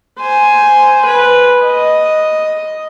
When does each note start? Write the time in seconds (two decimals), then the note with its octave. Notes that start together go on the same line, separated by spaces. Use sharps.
0.20 C5 G#5
1.07 B4
1.64 D#5